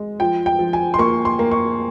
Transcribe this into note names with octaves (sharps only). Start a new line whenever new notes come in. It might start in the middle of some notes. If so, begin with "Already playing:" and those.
Already playing: G#3
F3 G5
G5
F3
G#5
C6
A#3 C#6
C6
A#3
C#6